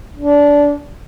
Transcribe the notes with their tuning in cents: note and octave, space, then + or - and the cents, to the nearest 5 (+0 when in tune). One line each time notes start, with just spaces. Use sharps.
D4 -20